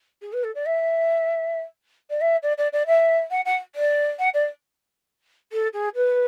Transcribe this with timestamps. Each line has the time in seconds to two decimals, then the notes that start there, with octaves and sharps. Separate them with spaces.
0.22 G#4
0.33 B4
0.44 A4
0.55 D5
0.66 E5
2.10 D5
2.21 E5
2.43 D5
2.58 D5
2.73 D5
2.87 E5
3.31 F#5
3.45 F#5
3.75 D5
4.19 F#5
4.34 D5
5.52 A4
5.73 G#4
5.96 B4